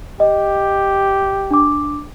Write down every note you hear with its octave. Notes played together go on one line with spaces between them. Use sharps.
G4 D#5
D4 D6